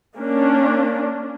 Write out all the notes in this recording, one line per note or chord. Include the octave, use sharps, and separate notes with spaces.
A#3 C#4 D4